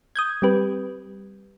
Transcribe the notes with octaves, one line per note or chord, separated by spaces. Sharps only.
D#6 G6 G#6
G3 C4 G4 B4